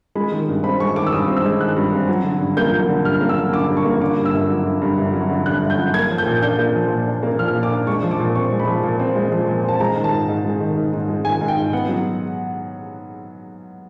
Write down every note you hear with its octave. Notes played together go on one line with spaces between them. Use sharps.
G#3 B5
D#3
G2
C4 B5
G#3 C#6
D#3 D6
E6
G2 D#6
C4
E6
G#3
D#3 F#6
G2
C4
F#3
D3
G2
A#3 G6
F#3
D3
G2 F6
A#3
E6
F#3
D3 D6
G2
C#6
A#3
D3 D6
G2
E6
G1
F#3
D3
G2
G1
F#3
D3
G2 F#6
G1
G6
F#3
A#3 G#6
F3
G6
A#2
D4 G6
A#3
F3
A#2
D4
A#3
F3 F6
A#2
D6
D4
G#3 C#6
F3
D6
A#2
C4 C#6
G#3
B5
F3
A#2
C4
G#3
F3
A#2
C4 A5
G#3 A#5
D#3
A5
G#2
G#2
G#3
D#3
G#2
G#2
G#3
D#3 G#5
G#2
G5
G#2
B3 F#5
F#3